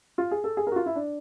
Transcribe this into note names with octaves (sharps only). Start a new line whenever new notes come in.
F4
G#4
A4
G#4
F#4 A#4
F4
E4
D4